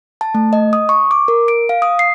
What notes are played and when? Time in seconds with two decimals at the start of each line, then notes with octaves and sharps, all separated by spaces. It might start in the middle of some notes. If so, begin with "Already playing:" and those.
0.21 A5
0.35 A3
0.53 D#5
0.73 D#6
0.89 C#6
1.11 D6
1.28 A#4
1.48 D7
1.69 F5
1.82 D#6
1.99 C7